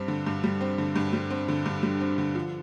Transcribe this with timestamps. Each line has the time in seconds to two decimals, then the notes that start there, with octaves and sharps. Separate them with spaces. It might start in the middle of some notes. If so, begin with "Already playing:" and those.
Already playing: G2 G3 C4
0.08 D3
0.26 G2
0.44 G3
0.61 C4
0.78 D3
0.96 G2
1.13 G3
1.30 C4
1.48 D3
1.66 G2
1.83 G3
2.01 C4
2.18 D3
2.35 F3